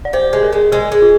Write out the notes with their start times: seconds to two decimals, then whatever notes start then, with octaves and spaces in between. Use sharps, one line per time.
0.05 D5
0.13 G4 C5
0.33 G#3
0.43 A#4
0.53 G#3
0.72 G#3 G#4
0.92 G#3
1.02 F4